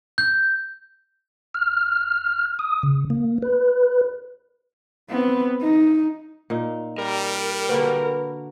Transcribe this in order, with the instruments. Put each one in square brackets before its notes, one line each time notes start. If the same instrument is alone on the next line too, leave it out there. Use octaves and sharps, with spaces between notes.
[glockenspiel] G6
[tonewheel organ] F6
D#6
C#3
A#3
B4
[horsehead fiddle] B3 C4
D#4
[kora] A#2 D#4
[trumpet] G3 [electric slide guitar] A#4
[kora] D3 A#3 F#4 [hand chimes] B4